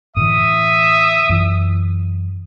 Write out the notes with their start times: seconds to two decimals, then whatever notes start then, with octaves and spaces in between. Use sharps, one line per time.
0.16 A2 D3 E3 E5 D#6
1.29 F#2 E3